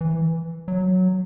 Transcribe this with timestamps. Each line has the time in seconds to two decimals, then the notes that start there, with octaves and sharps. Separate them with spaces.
0.01 E3
0.68 F#3